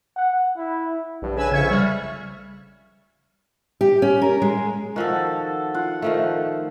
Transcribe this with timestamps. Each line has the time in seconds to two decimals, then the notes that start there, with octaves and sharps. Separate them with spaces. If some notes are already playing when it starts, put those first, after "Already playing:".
0.17 F#5
0.57 E4
1.22 A#1 G2
1.36 C#3 B4 G#5 E6
1.51 F2 C#3 E5 F5 C#6 G#6
1.71 G3 F6
3.81 G4
4.02 C#4
4.22 A#4
4.42 G#3
4.96 D#3 F3 F#4 A4
5.74 F4 F#5
6.02 D#3 F3 A3